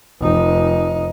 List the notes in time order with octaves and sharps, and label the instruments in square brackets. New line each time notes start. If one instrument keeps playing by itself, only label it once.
[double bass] F1 D#4